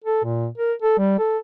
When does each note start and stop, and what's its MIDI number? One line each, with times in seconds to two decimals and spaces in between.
0.04 0.21 69
0.24 0.47 46
0.58 0.73 70
0.82 0.95 69
0.98 1.19 55
1.19 1.38 69